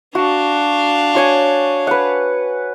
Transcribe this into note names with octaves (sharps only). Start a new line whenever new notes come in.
D4 F#4 F5
F#4 C#5 G#5
B4 F#5